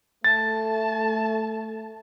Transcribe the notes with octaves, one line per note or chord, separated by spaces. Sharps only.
A3 A5 A6